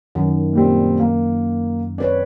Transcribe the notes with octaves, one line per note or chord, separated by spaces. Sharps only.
F#2 D#3
A#2 G3 C4
A#3
C4 B4 C#5 D5